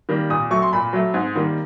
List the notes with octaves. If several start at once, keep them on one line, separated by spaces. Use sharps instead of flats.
D#3 G3 A#3
A#2 D#6
F#3 A3 C#6
C6
A#2 B5
F#3 A3
G#2
D#3 G3 A#3